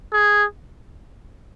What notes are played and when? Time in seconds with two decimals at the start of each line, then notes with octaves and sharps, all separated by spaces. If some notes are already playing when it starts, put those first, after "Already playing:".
0.13 G#4